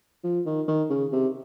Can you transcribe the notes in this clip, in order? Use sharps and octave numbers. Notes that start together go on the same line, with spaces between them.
F3
D#3
D#3
C#3
C3